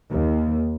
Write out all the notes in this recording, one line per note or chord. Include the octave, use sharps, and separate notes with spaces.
D#2